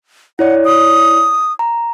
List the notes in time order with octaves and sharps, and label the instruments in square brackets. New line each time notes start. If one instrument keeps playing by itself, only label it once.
[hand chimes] E4 C#5 D5 [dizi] F#5
[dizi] D#6
[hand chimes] A#5